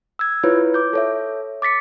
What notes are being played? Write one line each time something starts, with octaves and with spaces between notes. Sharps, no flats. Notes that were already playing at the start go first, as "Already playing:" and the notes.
E6 G#6
E4 F4 B4 C#5
D6 G6
A4 C#5 E5
D6 A6 B6 C#7